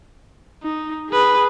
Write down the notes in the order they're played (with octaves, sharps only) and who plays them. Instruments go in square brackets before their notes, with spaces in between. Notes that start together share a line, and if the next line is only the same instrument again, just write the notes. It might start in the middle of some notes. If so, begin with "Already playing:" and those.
[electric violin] D#4
G#4 B4